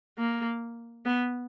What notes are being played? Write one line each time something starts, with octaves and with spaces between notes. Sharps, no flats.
A#3
B3